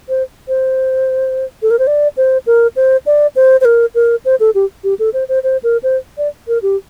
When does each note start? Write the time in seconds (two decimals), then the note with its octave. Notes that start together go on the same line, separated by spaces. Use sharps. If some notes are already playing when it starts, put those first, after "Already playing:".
0.09 C5
0.48 C5
1.62 A4
1.71 A#4
1.79 C5
1.87 D5
2.17 C5
2.47 A#4
2.76 C5
3.06 D5
3.36 C5
3.61 C5
3.65 A#4
3.95 A#4
4.25 C5
4.40 A4
4.55 G4
4.84 G4
4.99 A4
5.14 C5
5.29 C5
5.43 C5
5.63 A#4
5.83 C5
6.18 D5
6.48 A#4
6.62 G4